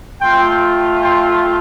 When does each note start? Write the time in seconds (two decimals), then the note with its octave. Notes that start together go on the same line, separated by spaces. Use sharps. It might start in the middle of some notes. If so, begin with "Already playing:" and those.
0.21 A3 F4 G5 C6
1.01 G5 C6